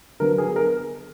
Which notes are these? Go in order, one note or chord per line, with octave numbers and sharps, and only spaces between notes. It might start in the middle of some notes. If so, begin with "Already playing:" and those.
D3 F#3 B3 A#4
G#4
A#4